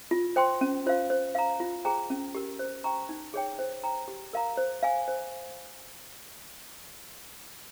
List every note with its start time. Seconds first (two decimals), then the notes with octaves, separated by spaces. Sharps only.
0.11 F4
0.36 C5 G5 C6
0.61 C#4
0.86 F4 C5 F5
1.10 C5
1.35 F5 A#5
1.60 F4
1.85 G#4 C5 G5 A#5
2.10 C#4
2.35 G4 A#4
2.59 C5
2.84 G5 A#5 C#6
3.09 D#4
3.34 G#4 C#5 G5
3.59 C5
3.84 G5 A#5
4.08 G4
4.33 A#4 F5 A#5
4.57 C5
4.83 F5 G#5
5.08 C5